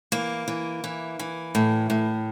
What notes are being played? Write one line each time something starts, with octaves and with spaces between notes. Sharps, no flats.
E3 A#3
E3
E3
E3
A2
A2